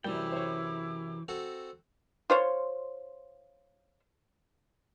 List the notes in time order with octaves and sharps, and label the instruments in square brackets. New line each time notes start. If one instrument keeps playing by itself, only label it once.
[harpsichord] F#2 C3 [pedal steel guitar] E3 G5 [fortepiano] G3 [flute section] E4 D6
[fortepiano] C5 C#5
[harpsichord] C4 F#4 A4
[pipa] F4 C5 C#5